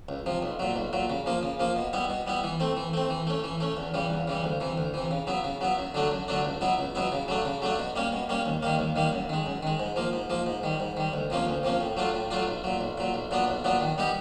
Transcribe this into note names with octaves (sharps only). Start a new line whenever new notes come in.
C#2
C3 F3
B1
A#2 F#3
B1
A#2 F#3
C#3
F3 A#3
C#3
F3 A#3
B2
G3 B3 E4
B2
G3 B3 E4
E3
A3 C4
E3
A3 C4
E3
A3 C#4
E3
A3 C#4
E2
C#3 E3 G3
E2
C#3 E3 G3
D2
C3 E3
D2
C3 E3
C#3
F#3 B3 E4
C#3
F#3 B3 E4
F#2
D3 F#3 A3 D4
F#2
D3 F#3 A3 D4
C#2
B2 F#3 B3 E4
C#2
B2 F#3 B3 E4
C#3
F#3 A3 D4
C#3
F#3 A3 D4
B2
G3 A#3 C#4
B2
G3 A#3 C#4
D#2
D#3 G3 A#3
D#2
D#3 G3 A#3
F#2
D#3 G#3
F#2
D#3 G#3
G#2
F3 A#3
G#2
F3 A#3
G#2
D#3 G3
G#2
D#3 G3
D2
C3 F3 A#3 C#4
D2
C3 F3 A#3 C#4
A2
F#3 A3 D4 F4
A2
F#3 A3 D4 F4
B1
A#2 F#3
B1
A#2 F#3
B1
A#2 F#3 B3 D4
B1
A#2 F#3 B3 D4
D#3
G3 B3 D#4 G4